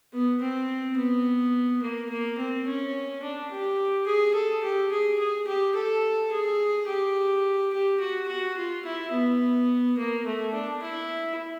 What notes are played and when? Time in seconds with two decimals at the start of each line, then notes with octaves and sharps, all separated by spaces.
0.13 B3
0.41 C4
0.97 B3
1.82 A#3
2.09 A#3
2.38 C4
2.66 C#4
3.23 D4
3.51 G4
4.06 G#4
4.34 A4
4.63 G4
4.91 G#4
5.19 G#4
5.47 G4
5.75 A4
6.31 G#4
6.87 G4
7.73 G4
8.00 F#4
8.28 F#4
8.57 F4
8.85 E4
9.12 B3
9.98 A#3
10.26 A3
10.53 D4
10.82 E4